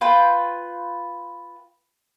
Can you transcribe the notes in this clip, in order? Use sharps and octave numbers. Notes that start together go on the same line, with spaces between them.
F4 B4 G5